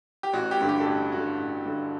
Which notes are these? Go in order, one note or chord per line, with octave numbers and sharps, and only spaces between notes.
G4
A1 F#4
G4
G2 D3
G4
A4
A1 G4
G2 D3 F#4
A1
G2 D3